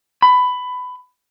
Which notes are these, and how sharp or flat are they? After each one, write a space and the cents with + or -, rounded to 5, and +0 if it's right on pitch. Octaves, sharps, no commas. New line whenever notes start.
B5 +15